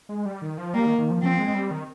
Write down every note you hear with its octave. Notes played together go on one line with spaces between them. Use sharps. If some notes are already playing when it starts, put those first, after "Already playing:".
G#3
G3
D#3
F3
G3 A#3
D#3
D#3
F3
F3 C4
G#3
G3
D#3